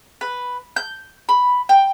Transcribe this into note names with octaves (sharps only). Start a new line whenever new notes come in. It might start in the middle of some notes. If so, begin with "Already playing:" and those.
B4
G6
B5
G5